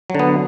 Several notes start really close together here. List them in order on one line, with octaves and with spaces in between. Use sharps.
F#3 D3 B3